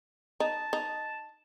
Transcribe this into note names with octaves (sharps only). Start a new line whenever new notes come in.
D#4 A5
D#4